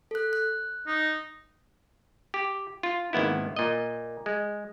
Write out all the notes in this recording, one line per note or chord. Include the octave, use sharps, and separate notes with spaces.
A4 F#6
F#6
D#4
G4
F4
G#1 D#2 B3 E4
A#2 D#5
G#3